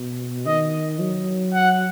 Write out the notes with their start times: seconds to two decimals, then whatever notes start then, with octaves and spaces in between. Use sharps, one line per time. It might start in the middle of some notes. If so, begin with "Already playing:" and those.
Already playing: B2
0.46 D#3 D#5
1.00 F#3
1.54 F#5